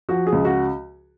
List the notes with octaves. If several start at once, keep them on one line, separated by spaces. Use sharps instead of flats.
F3 F#4
G#4
C#2
F#4